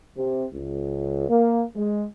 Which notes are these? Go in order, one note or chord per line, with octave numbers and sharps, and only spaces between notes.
C3
C#2
A#3
G#3